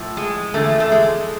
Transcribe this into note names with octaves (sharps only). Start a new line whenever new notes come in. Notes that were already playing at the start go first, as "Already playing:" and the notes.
Already playing: A2 F3
G#3
E2 D3 F3 A3
A3
G#3